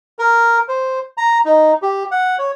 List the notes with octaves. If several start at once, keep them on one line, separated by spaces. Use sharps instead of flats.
A#4
C5
A#5
D#4
G4
F#5
C#5